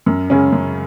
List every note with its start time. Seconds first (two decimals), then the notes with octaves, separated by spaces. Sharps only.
0.06 F#2
0.30 C#3 G#3 C#4
0.52 F#2